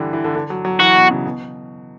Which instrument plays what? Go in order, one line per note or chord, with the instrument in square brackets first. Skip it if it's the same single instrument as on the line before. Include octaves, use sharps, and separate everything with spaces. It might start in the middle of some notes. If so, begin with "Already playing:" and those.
Already playing: [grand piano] D3 E3 G3
E3
D3
D3
F#3
F#3
[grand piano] E3 [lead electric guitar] F#4
[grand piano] B2
C#3
B2